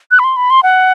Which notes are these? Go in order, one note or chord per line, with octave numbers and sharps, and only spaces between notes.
F#6
B5
C6
B5
C6
F#5